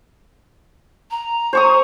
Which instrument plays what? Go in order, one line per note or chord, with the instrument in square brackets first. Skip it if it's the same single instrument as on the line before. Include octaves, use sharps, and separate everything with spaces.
[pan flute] A#5
[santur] C5 C#6 D#6